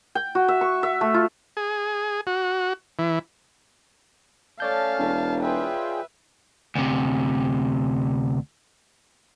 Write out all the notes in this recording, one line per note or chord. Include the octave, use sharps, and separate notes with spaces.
G5
F#4
E5
C#6
E5
A3
F4
G#4
F#4
E3
A3 C#4 C#5 D5 F5 A5 G6
E1
F4 G#4 B4 E5 G5
D2 C3